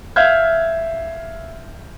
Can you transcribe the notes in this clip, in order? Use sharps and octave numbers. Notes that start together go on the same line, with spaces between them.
E5 F5 F6 G6 G#6